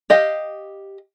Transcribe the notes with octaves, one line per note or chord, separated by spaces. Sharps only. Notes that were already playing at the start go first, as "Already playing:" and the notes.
G4 D#5 F5